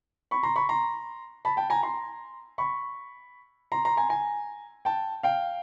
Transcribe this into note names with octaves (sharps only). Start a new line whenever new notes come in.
B5 C#6
A#5 C6
B5 C#6
A#5 C6
A5 B5
G5 A5
G#5 A#5
A#5 C6
B5 C#6
A#5 C6
A#5 C6
G#5 A#5
G#5 A#5
G5 A5
F5 G5